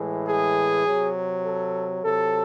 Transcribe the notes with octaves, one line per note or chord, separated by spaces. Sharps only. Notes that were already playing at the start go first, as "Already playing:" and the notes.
Already playing: A2 E3 G#3
G#4
C3 F#3
A4
C3 F#3 A4